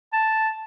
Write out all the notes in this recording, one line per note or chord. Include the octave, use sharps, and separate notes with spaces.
A5